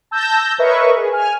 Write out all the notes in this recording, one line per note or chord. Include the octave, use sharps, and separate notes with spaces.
A5 E6 G6 A#6
A#4 B4 C#5 D#5 E5 C#6
G#4
G#5 F6